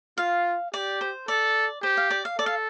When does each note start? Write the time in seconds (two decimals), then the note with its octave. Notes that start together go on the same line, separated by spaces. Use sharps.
0.18 F4 F5
0.74 G4 D5
1.01 C5
1.28 A4 D5
1.83 G4 C5
1.97 F5
2.11 D5
2.25 F5
2.39 A4 D5
2.46 F5